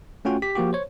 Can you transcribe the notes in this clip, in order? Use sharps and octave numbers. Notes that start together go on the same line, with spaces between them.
A3 C#4 F4 F#4 G5
G4 B6
F3 A#3 F#4 G4
C5 C#5